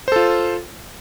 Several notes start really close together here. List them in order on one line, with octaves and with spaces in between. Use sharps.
C5 A4 F4